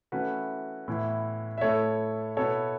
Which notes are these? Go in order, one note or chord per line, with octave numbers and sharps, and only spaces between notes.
E3 A3 C#4 E4 F#4 B4
A2 E3 B3 E4
E5
A2 A3 E4 A4 C#5
B2 B3 E4 A4 C#5